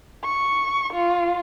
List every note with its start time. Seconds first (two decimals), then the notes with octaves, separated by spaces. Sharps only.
0.24 C#6
0.93 F4